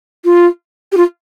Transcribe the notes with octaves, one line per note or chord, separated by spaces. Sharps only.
F4
G4
F4